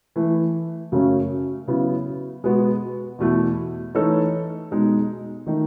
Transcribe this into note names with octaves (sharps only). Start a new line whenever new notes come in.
E3 A3 E4
F#2 C#3 F#3 A3 C#4
C#3 F#3 B3 E4
B2 G#3 B3 F#4
E2 B2 A3 E4
E3 A3 D#4 A4 C#5
B2 G#3 D#4
D#3 A3 D#4